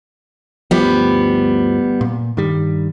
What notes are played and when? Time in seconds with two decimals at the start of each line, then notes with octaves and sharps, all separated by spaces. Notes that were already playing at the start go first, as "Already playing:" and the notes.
0.71 G1 D2 F3 G3 B3
2.01 A#2
2.37 G2 D#3 G3